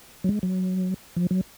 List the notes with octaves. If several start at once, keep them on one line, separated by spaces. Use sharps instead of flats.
F#3
G#3
F#3
F3
F#3